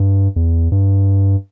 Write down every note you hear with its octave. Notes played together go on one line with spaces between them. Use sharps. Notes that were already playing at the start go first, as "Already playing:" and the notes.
Already playing: G2
E2
G2